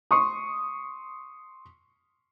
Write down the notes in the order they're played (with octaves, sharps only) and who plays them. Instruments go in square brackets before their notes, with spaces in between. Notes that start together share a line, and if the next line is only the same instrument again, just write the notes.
[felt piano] C6 C#6 D#6